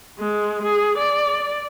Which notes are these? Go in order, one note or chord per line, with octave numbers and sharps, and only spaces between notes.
G#3
G#4
D5